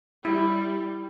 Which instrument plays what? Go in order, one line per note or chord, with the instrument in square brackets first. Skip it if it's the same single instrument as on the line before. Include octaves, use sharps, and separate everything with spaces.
[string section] G3 [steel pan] E4